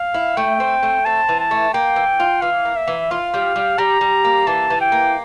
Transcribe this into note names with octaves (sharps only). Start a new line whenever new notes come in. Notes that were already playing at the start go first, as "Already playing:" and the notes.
Already playing: F5
E4
A3 G5
C4
A3
C4 A5
E3
A5
A3
A#3 G5
E3
F4
E3 F5
A#3
E5
E3
F4 F5
G3
G3
G3 A#5
G3
A#3
E3 A5
E3
G5
A#3